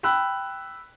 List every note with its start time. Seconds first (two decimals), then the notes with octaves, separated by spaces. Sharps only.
0.03 G5 B5 E6 F#6